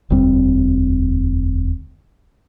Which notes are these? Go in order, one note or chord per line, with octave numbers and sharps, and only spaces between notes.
E1 D2 G3 C4